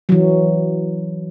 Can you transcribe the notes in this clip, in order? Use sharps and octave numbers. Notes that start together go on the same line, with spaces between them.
E3 F#3